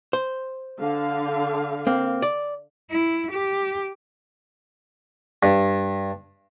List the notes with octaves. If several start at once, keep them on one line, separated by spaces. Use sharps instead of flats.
C5
D3 F5
A#3 C4
D5
E4
G4
G2